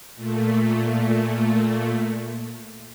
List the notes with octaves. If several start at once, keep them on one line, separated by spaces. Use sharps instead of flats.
A#2 A3